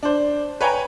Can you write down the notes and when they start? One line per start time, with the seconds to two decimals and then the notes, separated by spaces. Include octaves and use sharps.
0.03 D4 C5
0.61 B4 C#5 G5 G#5 A#5